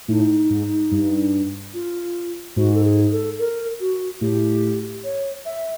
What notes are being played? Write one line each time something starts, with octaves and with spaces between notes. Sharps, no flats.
A2 D#4
G#2
G2
F4
G#2 F#4
A4
G#4
A4
A#4
F#4
A2 G4
C#5
E5